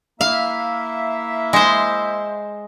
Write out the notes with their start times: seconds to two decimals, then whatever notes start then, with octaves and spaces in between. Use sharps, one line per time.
0.21 A#3 E4 E5 F5
1.53 G#3 C5